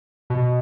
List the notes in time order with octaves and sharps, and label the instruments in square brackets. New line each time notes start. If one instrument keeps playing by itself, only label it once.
[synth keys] B2